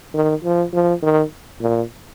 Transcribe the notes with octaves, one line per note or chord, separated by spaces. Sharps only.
D#3
F3
F3
D#3
A#2